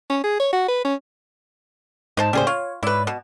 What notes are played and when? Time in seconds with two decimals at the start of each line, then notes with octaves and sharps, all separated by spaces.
0.10 C#4
0.24 G#4
0.40 C#5
0.53 F#4
0.68 B4
0.85 C#4
2.17 G#2 D#4 C5 A5
2.33 A2 C#3 G3 A#3 G#4 C5
2.47 F4 C#5
2.83 G#2 E4 B4 C#5 D5
3.07 B2